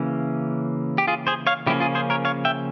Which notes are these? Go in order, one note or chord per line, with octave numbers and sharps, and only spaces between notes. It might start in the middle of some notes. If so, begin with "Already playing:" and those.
Already playing: C#3 E3 A#3 C#4
G4
F4 G#4
G#4 C5
C#5 F5
C#3 F3 A#3 C#4 E4 G4
F4 G#4
G#4 C5
A#4 C#5
C#5 F5
E5 G5